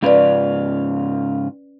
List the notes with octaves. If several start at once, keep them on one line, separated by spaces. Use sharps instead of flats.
G#2 C#3 C#4 F4 B4 D5